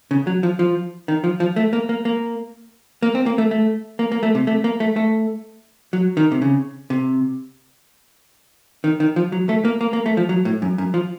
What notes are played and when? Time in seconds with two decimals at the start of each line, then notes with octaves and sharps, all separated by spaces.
0.11 C#3
0.27 F#3
0.43 F3
0.59 F3
1.08 D#3
1.24 F3
1.40 F3
1.56 A3
1.73 A#3
1.89 A#3
2.05 A#3
3.03 A#3
3.15 C4
3.26 A#3
3.38 A3
3.51 A3
3.99 A#3
4.12 A#3
4.23 A3
4.35 C3
4.47 A3
4.64 A#3
4.80 A3
4.96 A3
5.93 F#3
6.17 D#3
6.32 C3
6.42 C#3
6.90 C3
8.84 D#3
9.00 D#3
9.16 F3
9.32 F#3
9.49 A3
9.65 A#3
9.81 A#3
9.93 A#3
10.06 A3
10.17 F3
10.29 F#3
10.45 A2
10.62 F#2
10.78 F#2
10.94 F3